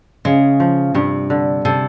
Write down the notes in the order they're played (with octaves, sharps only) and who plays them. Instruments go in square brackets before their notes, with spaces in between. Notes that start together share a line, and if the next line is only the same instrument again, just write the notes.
[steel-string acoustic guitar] C#3 [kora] G#3
[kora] F3
[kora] G2 [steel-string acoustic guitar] C3
[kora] D3
[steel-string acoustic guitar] C3 [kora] A4